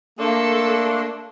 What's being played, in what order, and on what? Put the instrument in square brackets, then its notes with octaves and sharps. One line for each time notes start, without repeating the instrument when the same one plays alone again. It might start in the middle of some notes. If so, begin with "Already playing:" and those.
[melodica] A3 C6 [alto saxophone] A#3 [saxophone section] D4 [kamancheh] A4